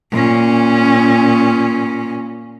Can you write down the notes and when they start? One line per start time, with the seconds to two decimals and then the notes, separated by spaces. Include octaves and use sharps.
0.12 A#2 C#4